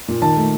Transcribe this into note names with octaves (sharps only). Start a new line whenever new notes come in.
A#2
D#3 A5
A3